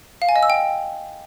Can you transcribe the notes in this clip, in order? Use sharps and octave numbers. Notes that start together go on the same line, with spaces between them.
F5
G#5
D#5
E6
G5